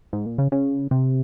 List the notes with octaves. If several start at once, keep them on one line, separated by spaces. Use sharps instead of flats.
G#2
A#2
C#3
C#3
C3